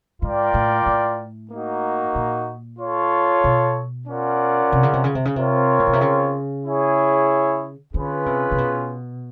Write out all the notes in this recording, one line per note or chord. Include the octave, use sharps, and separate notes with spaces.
G#2 F4 A#4 D5 G5
A2
A2
A#3 D#4 F#4
A#2
F4 A4 C#5
B2
C#4 F4 A#4 D5 F#5
C3
C#3
C3
C#3
C3
C#3
C3 C4 F4 A#4 C#5
A#2
B2
C3
C#3
E4 G#4 C#5
D3 C#4 F4 G#4 B4
C3
C3
B2